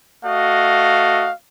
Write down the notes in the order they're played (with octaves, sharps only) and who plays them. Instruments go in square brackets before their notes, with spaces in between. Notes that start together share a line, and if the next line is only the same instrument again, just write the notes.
[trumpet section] A3 F#4 D#5 [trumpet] F5